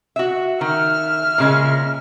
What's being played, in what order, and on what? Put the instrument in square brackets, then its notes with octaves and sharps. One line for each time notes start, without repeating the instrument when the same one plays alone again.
[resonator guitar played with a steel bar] F#4 E5
[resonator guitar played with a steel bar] D#3 [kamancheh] E5 F6
[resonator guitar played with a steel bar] A#2 C#3 G#3